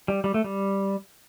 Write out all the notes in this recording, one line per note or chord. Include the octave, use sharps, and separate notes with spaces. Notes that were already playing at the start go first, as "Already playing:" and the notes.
G3
G3
A3
G3